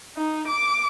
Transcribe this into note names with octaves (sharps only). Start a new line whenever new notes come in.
D#4
D6